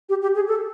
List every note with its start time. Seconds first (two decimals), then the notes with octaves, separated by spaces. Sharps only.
0.09 G4
0.22 G4
0.35 G#4
0.48 A4